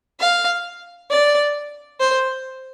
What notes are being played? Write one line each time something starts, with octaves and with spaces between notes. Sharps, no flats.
F5
D5
C5